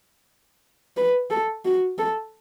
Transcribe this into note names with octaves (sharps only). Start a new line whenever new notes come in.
B4
A4
F#4
A4